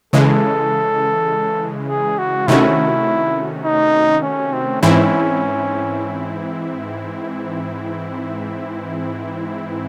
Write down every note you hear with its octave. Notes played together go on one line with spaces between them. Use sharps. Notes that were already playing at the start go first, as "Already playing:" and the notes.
C#3 E3 G#3 A4
G#4
F#4
C3 D#3 A3 C#4 E4 F#4
D#4
C#4
C4
G#2 E3 C4 C#4 E4